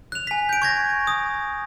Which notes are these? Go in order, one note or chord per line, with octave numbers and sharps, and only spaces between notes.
F#6 F7
G#5 B6
G6 D7
C#6 G#6 A#6
D#6